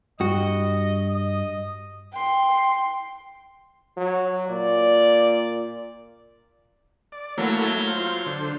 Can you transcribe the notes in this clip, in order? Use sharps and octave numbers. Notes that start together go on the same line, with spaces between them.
G2 F#4 D#5
D#5
G5 C6
F#3
A#2 D5
D5
F#3 A3 A#3 E4
F4 C5
D3 C5